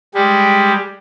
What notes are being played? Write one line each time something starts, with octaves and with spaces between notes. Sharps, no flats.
G3 G#3 G4